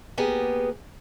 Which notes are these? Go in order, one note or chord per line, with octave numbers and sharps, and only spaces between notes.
A#3 B3 G4 G#4